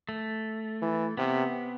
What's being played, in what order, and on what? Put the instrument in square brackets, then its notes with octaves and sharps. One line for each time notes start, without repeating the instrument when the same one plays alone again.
[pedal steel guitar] A3
[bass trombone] E3
[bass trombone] C3 [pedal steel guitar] B3